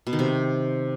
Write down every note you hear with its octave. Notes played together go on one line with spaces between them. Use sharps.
B2
D#3
C3